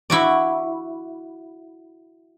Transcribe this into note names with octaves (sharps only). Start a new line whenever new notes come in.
E4 F#4 D5